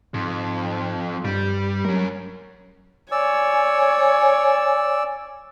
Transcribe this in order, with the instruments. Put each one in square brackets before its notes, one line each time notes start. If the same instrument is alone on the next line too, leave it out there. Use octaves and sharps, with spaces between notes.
[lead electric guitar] F2 [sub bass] G#2
[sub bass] G2 [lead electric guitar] G3
[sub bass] F#3 [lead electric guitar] C#4 A#4
[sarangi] C#5 [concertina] D5 E6 [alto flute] G#5